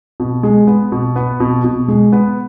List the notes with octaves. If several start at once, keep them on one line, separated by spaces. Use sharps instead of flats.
B2
G#3
B3
B2
B3
B2
B2
G#3
B3